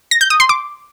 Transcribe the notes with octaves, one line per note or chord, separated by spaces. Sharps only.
A#6
G6
D#6
C6
D6